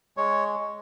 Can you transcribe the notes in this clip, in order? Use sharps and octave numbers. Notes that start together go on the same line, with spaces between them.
G#3 C#5